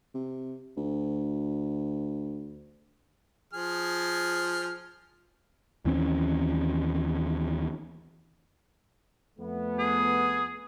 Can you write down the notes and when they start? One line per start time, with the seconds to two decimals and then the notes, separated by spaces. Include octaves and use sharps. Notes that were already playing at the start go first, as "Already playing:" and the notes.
0.14 C3
0.77 D2
3.53 F3 G#4 F6
5.85 D#2 E3 C4 C#4
9.39 F2 A3 B3
9.79 G#4